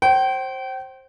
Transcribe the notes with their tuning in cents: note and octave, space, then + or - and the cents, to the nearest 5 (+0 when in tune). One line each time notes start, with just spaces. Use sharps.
C5 +20 G5 -35